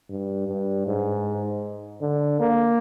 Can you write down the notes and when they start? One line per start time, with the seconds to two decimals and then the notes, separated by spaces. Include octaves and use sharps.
0.09 G2
0.47 G2
0.87 G#2
2.01 D3
2.40 A#3